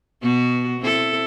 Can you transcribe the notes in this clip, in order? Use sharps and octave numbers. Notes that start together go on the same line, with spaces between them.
B2 B3 F#4
C4 E4 A4